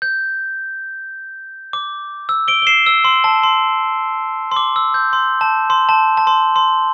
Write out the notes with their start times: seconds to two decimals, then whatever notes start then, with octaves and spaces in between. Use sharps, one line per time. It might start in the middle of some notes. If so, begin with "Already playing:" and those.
0.02 G6
1.73 D6
2.29 E6
2.48 D7 G7
2.62 G7
2.67 C7 E7
2.86 E6
3.05 C6
3.24 A5
3.43 C6
4.52 C6
4.56 D6
4.76 E6
4.94 G6
5.13 C6
5.41 A5
5.70 C6
5.89 A5
6.17 A5
6.27 C6
6.56 C6